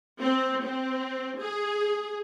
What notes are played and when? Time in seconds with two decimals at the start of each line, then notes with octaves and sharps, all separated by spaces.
0.20 C4
0.64 C4
1.39 G#4